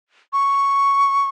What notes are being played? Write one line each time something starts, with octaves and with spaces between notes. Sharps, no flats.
C#6